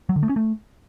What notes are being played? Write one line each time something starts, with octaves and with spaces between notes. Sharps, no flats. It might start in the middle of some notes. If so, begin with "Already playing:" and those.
F#3
D3
A3
C#4
A3